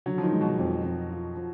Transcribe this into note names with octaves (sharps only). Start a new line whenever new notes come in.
D3 F#3
F3
D#3
G#3
B2
F2
F2
F4
F3